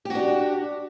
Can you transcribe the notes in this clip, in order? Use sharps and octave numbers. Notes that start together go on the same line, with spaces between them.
D4 F#4 G4